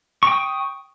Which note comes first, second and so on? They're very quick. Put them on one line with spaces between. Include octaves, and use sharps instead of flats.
C#6 G5 D#6